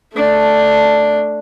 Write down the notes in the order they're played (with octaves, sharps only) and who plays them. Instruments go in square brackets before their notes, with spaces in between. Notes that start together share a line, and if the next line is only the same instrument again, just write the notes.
[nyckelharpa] A3 D4